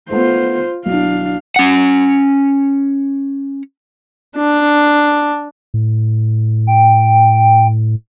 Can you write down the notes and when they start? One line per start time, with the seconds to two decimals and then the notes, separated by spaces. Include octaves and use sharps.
0.11 A3 B3 F4 C5
0.86 B1 D4 E4 F5
1.56 C#4 F#5
4.37 D4
5.74 A2
6.67 G5